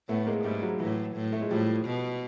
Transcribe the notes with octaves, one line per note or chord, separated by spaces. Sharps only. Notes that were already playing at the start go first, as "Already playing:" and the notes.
A2 A3 B3
G#3 A#3
G#2 G3 A3
F#3 G#3
A2 E3 F#3
A2
A3
G#3
A2 F3 G3
B2